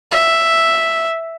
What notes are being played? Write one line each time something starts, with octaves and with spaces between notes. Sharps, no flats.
E5